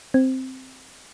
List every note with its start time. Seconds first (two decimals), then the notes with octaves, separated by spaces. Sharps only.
0.14 C4